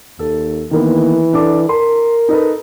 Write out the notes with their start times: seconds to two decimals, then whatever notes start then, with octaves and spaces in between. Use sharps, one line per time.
0.19 D#2 A4
0.71 D#3 E3 A#3 B3
1.33 D4 A4 D6
1.69 A#4 C6
2.29 D#4 A4 B4